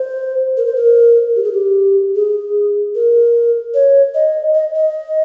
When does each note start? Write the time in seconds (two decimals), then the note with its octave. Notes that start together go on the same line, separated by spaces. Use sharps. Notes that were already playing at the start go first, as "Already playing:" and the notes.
Already playing: C5
0.57 A#4
0.66 C5
0.76 A#4
1.36 G4
1.43 G#4
1.52 G4
2.15 G#4
2.95 A#4
3.74 C#5
4.15 D#5
4.55 D#5
4.74 D#5